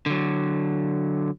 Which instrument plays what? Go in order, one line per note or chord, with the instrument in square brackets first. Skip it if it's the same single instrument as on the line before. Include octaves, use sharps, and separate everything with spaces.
[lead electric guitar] D3 F#3